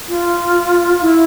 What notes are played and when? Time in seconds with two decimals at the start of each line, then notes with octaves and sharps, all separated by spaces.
0.08 F4
1.01 E4